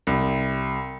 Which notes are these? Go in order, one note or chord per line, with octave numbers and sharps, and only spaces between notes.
C2